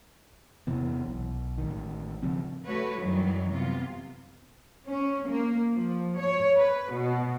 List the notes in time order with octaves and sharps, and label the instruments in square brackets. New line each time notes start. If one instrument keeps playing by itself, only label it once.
[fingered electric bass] E2 C3 E3 B3
B1
A1 D#3
C#3 F3 C4
[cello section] A3 F#4 B4 C#5
F#2 D#3 E3 F#3 G3
C3 B3 F4
C#4
A#3
F3
C#5
B4
B2